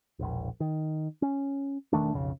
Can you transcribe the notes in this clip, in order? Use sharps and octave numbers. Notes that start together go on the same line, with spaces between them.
E1 A#1
D#3
C#4
E1 D#3 A3 D4
B1 F2 C#3